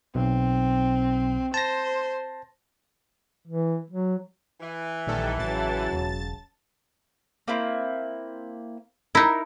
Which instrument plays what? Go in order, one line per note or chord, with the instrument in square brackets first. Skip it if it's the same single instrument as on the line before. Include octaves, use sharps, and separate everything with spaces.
[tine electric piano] B1 [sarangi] C4
[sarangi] C5 [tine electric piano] A5 A#6
[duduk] E3
F#3
[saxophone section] E3
[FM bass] A#1 [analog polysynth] D#3 G3 A4
[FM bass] A1 [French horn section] C#3 F#3 [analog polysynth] A5 A6
[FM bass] E1
[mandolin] A#3 C4 E4
[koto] D#4 E4 [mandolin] A#4 E6